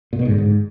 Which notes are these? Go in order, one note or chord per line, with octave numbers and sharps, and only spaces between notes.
A#2
B2
G#2
D3
G#2